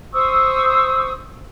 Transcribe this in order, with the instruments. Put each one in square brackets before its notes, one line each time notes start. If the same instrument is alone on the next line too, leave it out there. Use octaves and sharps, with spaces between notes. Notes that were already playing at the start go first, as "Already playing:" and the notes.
[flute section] C5 C#6 D#6 E6